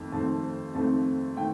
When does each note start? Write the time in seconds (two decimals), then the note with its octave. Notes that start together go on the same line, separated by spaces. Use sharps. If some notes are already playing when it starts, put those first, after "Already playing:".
Already playing: F2 D#3 A3 C4
0.12 F2 D#3 A3 C4 A5
0.75 F2 D#3 A3 C4 A5
1.37 D#3 A3 C4 G5